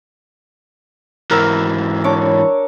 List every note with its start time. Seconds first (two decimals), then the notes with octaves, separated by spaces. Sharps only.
1.31 G#2 E3 A#4 E5
2.04 D4 C#5 D6